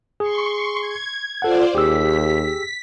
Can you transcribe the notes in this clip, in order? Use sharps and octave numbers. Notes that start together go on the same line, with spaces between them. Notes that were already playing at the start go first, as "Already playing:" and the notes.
G#4 C6 C#6
G#6
F4 A4 C5 D5 F#5
D#2 G4 G#4 E6 B6